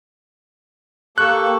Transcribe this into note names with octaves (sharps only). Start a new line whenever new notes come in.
A#3 G4 A4 C#6 F#6